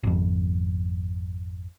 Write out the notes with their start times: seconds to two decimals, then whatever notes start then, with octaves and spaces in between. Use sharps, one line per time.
0.03 G#1 F2